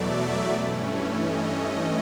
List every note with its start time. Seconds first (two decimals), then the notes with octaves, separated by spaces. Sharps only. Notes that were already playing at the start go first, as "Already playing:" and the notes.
Already playing: E2 B2 F#3 A3 D5 E5
0.50 G2 E3 A3 C#4
1.14 D#5
1.46 D#5